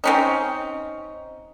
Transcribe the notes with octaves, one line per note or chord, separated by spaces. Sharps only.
C4 C#4 D#4